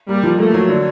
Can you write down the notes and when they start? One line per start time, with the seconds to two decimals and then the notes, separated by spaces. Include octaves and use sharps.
0.09 G3 A#3
0.23 F3
0.38 A3 A#3
0.54 F#3
0.69 D3